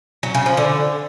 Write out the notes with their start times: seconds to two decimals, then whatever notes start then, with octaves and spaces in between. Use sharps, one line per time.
0.23 F#3
0.34 C#3
0.46 F3
0.57 D3